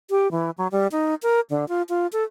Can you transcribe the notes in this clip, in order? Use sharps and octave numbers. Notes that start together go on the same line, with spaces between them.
G4
E3
F#3
G3
D#4
A#4
D3
F4
F4
A4